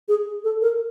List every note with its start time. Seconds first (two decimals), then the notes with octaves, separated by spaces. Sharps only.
0.08 G#4
0.44 A4
0.62 A#4